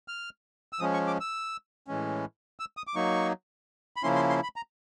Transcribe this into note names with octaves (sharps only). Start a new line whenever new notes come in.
F6
E6
F3 G#3 C#4 D#6
C#6
D6
E6
A2 E3 G#3 C#4
E6
D#6
D6
F#3 A#3 D#4 C#6
B5
C#3 F3 A#3 C#4 E4 C6
C6
C6
B5
A#5